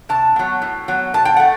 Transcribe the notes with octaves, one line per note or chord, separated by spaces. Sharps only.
C3 A5
F#3 B3
A2
F#3 B3
B2 A5
G5
A3 F#5